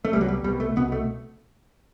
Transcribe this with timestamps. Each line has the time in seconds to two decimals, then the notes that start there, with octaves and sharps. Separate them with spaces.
0.05 A3
0.12 C2 B2 G3
0.21 F#3
0.28 G3
0.44 C2 B2 G3
0.60 A3
0.76 C2 B2 B3
0.92 A3